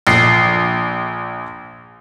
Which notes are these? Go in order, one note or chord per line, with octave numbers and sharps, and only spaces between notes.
A#1 C7